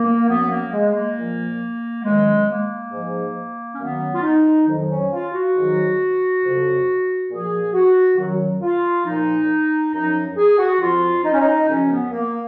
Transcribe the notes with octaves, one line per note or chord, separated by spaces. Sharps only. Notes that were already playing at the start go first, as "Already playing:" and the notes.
Already playing: A#3
F#2 F3 B3
A#3
G#3
A#3
A#2 F3
F#2 D#3 F#3 G#3
A#3
G#2 F3
C#4
F#2 D#3 F#3 B3
F4
D#4
F2 D#3 F#3
C#4
F4
F#4
G#2 D#3 F#3
F2 C#3 F#3
A#2 F3 G#4
F#4
F#2 D#3 F#3
F4
A#2 F3 D#4
F#2 F3 D#4
G#4
F#4
F2 F3 F4
D#4
C#4
D#4
F#2 C#3 F3 C#4
B3
A#3